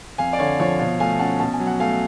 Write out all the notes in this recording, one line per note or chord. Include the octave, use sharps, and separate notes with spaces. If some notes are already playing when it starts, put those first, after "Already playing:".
F2 F5 G#5
D5
D3 C#5 F5
F3 C#5 F5
B2 C#5 F5
A3 F5 G#5
C#4 F#5 A5
B2 A5
G#5
F#3
F#5
A3 F5 G#5